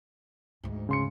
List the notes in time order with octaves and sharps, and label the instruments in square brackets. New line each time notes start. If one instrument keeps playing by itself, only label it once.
[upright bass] D2 G#2
[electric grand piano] C#3 C6 C#7